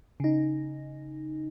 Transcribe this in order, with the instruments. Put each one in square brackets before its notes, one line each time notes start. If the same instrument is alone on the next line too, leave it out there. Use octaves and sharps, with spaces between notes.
[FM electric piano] C#3 D#4